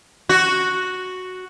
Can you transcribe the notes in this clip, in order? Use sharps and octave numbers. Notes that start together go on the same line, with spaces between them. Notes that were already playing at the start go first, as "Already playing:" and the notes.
F#4